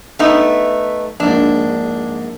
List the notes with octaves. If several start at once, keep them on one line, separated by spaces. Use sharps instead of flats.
A3 B3 D#4 E5
A#1 G#2 D4